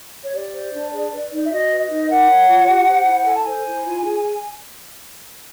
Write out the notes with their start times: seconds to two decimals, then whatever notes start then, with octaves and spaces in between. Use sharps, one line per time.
0.24 C#5
0.33 G4 D5
0.52 C5
0.73 D4
0.92 G#4
1.12 B4
1.32 D#4
1.45 E5
1.51 F#4 D#5
1.70 B4
1.80 D#5
1.89 D#4
2.09 A#4 F#5
2.29 C#5
2.48 F4
2.68 G4
2.87 C5
3.07 E4
3.26 A4 G#5
3.35 A5
3.44 C5 G#5
3.66 E4
3.86 F4
4.05 G#4